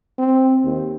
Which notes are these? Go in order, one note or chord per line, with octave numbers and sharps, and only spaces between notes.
C4
D#2